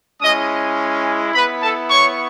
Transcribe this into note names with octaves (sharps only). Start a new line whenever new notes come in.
G#3 C#4 E4 D#5 D#6
B3 E4 B4 B5
A4 A5
C#5 C#6